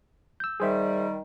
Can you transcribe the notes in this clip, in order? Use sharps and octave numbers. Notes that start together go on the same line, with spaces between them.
E6 G6
D#3 G3 G#4 C5 E5